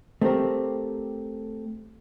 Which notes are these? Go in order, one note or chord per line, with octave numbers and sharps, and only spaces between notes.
A3 C4 G4 A#4